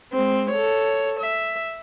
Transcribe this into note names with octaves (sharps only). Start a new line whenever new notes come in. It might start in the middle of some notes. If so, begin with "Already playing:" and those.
G#3 C4
A4 C#5
E5